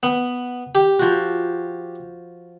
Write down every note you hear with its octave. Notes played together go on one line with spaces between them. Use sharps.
B3
G4
F3 F#4